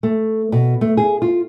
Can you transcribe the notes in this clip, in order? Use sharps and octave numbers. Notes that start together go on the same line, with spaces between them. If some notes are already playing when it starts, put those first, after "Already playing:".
A3
B2
A3
G#4
F4